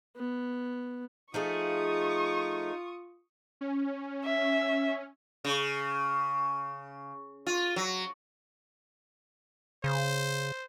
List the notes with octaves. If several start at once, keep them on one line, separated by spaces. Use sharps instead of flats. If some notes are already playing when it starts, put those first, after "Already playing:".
B3
F3 A3 D#4 F4 G#4 C#6 D#6
C#4
E5
C#3
F4
F#3
C#3 C5